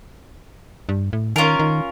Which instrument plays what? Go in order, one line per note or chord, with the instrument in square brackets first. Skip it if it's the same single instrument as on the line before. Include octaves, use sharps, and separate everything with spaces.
[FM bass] G2
A2
[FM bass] D#3 [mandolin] C#4 F4 A#4
[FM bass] D#3